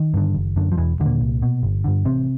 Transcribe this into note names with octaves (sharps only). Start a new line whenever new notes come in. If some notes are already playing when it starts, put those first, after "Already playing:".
Already playing: D#3
G2 D3
F#1
F#2 D3
F3
E1 E2 E3
D#2 D3
A#2 A#3
C2
B2
G1
G2 D3
A1 C3 C4